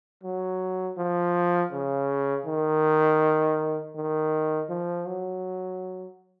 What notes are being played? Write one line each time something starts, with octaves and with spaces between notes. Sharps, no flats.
F#3
F3
C#3
D#3
D#3
F3
F#3